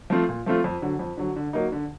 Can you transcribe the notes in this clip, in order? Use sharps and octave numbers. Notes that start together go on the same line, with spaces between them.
F3 A3 C4 F4
A#2
F3 A3 C4 F4
F2
D3 F#3
F2
D3 F#3
D3
F#3 A#3 D#4
D3